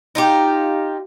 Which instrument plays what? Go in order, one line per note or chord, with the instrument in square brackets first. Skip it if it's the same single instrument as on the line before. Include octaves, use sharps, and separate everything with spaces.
[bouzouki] D#4 F4 G4